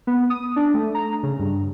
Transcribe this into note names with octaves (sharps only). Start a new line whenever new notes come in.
B3
D#6
D4
A3
A#5
C#3
G2